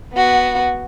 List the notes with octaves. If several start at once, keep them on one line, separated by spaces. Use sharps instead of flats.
B3 F#4